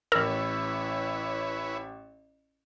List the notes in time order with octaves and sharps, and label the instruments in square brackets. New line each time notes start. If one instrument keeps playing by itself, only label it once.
[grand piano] A1 E6 [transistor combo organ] E4 B4 C#5 [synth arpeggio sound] A#4